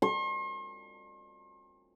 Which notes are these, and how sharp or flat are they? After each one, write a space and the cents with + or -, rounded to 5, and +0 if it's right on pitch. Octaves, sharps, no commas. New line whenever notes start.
C6 +45